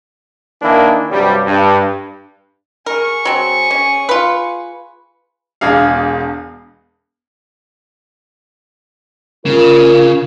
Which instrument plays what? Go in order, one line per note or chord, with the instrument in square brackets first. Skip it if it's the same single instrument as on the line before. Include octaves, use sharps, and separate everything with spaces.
[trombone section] D#3 E3 A#3 D4 E4
G2 C3 F#3 G3
G2
[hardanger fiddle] G#4 C#6 [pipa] A#4
[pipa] F#3 C4
C#4
F4 B4
[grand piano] E1 E2 D4 G#4 F5
[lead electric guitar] C#3 [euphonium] F4 [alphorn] A#4